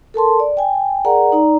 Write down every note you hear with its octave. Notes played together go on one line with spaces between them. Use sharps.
A4 A#4 A5 C6
D5
G5 G#5
G#4 A#4 D5 F#5 A#5
D#4 D5 A#5